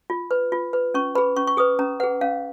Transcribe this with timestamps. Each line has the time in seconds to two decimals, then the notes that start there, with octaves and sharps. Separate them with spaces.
0.10 F4
0.31 B4
0.52 F4
0.73 B4
0.94 C#4 C#6
1.15 B4 B5
1.18 G#4
1.36 C#4 C#6
1.47 C#6
1.57 G#4 B4 D#6
1.79 C#4 A#5
2.00 G#4 B4 F#5
2.21 C#4 F5